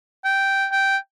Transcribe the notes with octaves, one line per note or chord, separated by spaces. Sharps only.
G5
G5